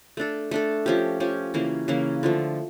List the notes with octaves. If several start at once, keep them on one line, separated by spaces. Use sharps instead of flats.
A3 D4 A4
A3 D4 A4
F3 C#4 G4
F3 C#4 G4
C#3 E3 A#3 C#4
C#3 E3 A#3 C#4
D3 F3 A3